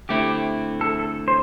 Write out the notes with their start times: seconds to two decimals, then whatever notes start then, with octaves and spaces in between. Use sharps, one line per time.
0.09 D3 A3 C4 E4 G4
0.81 A4
0.99 A4
1.28 C5